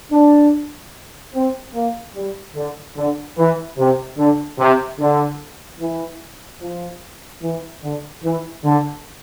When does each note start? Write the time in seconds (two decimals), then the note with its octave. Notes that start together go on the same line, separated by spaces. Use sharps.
0.12 D4
1.35 C4
1.74 A#3
2.15 G3
2.56 D3
2.97 D3
3.38 E3
3.78 C3
4.18 D3
4.59 C3
4.99 D3
5.80 E3
6.61 F3
7.42 E3
7.83 D3
8.24 E3
8.64 D3